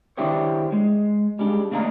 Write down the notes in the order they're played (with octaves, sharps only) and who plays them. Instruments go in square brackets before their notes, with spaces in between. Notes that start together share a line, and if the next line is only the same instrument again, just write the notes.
[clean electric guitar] D#3 D4 E4 G4 C5 C#5
G#3
G3 G#3 D4
A3 A#3 D4 D#5 A#5